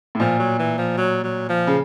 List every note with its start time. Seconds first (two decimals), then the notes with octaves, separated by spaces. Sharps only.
0.15 A2
0.20 A#2 F3
0.40 F#3
0.59 E3
0.78 F3
0.97 F#3
1.24 F#3
1.49 F3
1.67 C#3